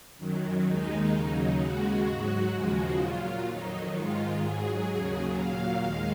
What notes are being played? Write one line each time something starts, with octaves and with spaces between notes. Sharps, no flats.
F#2 D#3 F#3
D#2 D#3 G#3 D#4
D#2 C#3 F#3
D#2 C#3 G#3 F#4
G#2 F#3
D#2 C#3 F3 G#3 F#4
A#2 F#3 F4
F2 D#3 F#3 D#4
G#2 D#3 G#3 F4
G#2 F#3 G#4
D#2 C#3 F#3
A#2 F#3 F5
D#2 D#3 G#3